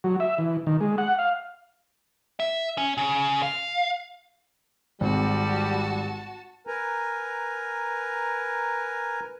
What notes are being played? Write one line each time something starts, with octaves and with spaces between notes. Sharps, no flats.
F#3
E5
E3
D#3
G#3
F#5
F5
E5
C#4
C#3
F5
G#1 G3 F#4 A5
A#4 B4 G#5 A#5